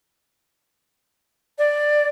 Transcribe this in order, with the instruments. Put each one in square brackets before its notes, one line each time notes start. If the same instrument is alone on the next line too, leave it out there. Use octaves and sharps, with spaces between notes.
[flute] D5